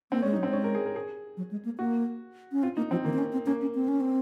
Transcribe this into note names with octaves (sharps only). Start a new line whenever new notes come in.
A#3 C4
G#3 C#4
D#4
F#3
C4
G#3 C#4
A#4
G#4
A#4
G#4
F#3
G#3
A#3
A#3 F#4
C#4
C4 F4
A#3 D#4
F3 C4
D#3 A#3
C4
C#4
C4
A#3 C#4
C#4
C4
C#4
C4